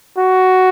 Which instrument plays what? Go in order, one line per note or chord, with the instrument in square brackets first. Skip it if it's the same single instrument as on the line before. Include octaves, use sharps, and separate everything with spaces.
[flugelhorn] F#4